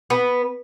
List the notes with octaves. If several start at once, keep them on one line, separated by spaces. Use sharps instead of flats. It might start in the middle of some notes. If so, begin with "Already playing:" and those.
B3